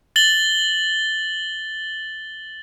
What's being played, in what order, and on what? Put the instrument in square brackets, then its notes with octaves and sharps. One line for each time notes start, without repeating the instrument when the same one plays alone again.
[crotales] A6 F#7 G7